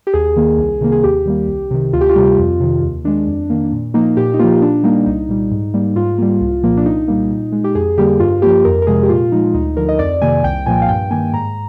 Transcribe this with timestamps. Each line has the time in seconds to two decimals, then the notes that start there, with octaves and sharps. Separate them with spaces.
0.07 G4
0.14 D#2 G#4
0.36 D#3 A#3
0.58 C2
0.81 C3 D#3 A#3
0.92 G#4
1.03 D#2 G4
1.26 D#3 G3 A#3
1.48 C2
1.71 C3 D#3
1.93 D2 F4
2.01 G4
2.09 F4
2.16 C3 G3
2.38 F2
2.60 C3 D#3
2.82 D#2
3.04 D#3 G#3 D4
3.27 F2
3.50 D#3 A#3
3.72 A#2
3.94 F3 A#3 D#4
4.17 A#2 G4
4.34 D#4
4.39 F3 A#3 F4
4.61 A#2 D4
4.84 G3 A#3 D#4
5.06 C2 D#4
5.29 A#2 G3
5.51 G#2
5.74 G3 A#3
5.96 G#2 F4
6.18 G3 A#3
6.41 C2
6.63 A#2 F3 A#3
6.77 D4
6.86 C2 D#4
7.08 A#2 G3 A#3
7.30 A#2
7.52 G#3
7.64 G4
7.75 F2 G#4
7.98 D3 G3 A#3 G4
8.20 G2 F4
8.42 F3 A#3 G4
8.65 F2 A#4
8.82 A#4
8.87 C3 F3 G#3 G#4
9.03 G4
9.09 A#2 F4
9.32 F3 G#3 D#4
9.54 D2 D#4
9.77 D3 F3 A#4
9.89 D#5
9.99 F2 D5
10.21 C3 D#3 A#3 G#5
10.44 C2 G5
10.66 A#2 F3 A#3 G#5
10.82 F5
10.88 G2 G5
11.11 D#3 A#3 G#5
11.33 G#2 A#5